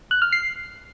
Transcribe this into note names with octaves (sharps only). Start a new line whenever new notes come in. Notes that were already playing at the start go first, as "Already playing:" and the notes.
F#6
F6
C7